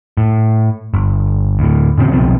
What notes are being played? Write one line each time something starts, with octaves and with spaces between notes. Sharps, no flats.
A2
G1
D2 A2
A2 C#3 C4
B1 B2 F3 C4